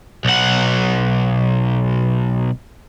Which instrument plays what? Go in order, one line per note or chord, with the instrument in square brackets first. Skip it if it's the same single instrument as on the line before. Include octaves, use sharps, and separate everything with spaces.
[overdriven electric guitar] B1 F#5